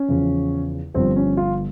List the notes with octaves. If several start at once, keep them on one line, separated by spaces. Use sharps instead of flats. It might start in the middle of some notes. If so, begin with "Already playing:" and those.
Already playing: C#4
E2 C#3 F3
G1 G2 F3 C4
C#4
F4